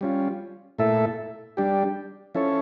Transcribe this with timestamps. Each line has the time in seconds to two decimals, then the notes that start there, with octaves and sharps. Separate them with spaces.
0.01 G3 C#4 F4
0.78 A#2 A3 E4 A4 E5
1.57 G3 D4 G4
2.35 F3 C#4 E4 A4 C#5